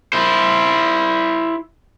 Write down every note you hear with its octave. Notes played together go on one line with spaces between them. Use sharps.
E4 C5